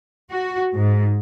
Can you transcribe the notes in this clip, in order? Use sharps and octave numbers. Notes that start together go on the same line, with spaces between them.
F#4
G#2